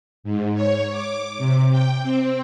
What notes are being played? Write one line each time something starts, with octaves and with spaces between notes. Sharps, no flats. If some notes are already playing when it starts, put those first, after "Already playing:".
G#2
C#5
D6
C3
G5
C4